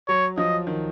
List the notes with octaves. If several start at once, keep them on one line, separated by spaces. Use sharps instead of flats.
F#3 C#5
F3 D#5
D#3